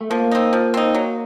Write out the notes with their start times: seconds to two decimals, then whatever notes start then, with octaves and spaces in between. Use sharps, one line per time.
0.01 A3
0.10 F3 A#3
0.31 C4 D#4
0.53 F3
0.74 C4 D#4
0.94 F#3